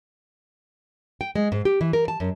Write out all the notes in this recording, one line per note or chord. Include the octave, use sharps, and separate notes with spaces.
G5
G#3
G#2
G4
E3
A#4
A5
F#2